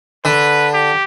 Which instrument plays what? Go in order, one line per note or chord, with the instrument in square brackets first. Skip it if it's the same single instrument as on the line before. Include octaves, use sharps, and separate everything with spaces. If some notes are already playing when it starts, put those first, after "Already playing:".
[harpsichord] D3 [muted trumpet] B4
[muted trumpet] G4